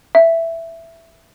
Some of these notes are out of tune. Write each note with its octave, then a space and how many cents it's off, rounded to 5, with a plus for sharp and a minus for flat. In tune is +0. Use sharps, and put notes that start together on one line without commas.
E5 +5